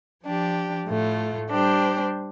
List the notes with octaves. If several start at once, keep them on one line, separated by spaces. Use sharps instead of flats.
F3 D4 G4
A2 A3 F4
G3 D4 G4 C5